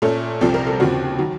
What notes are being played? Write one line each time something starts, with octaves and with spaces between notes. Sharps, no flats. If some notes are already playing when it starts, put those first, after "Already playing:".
A#2 A3 C#4 A4
C2 C3 F3 C4 A4
A#4
A4
D#2 C#3 F3 C4 F#4
D#3 F#3